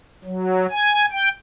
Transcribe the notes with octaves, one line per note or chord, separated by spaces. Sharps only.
F#3
G#5
G5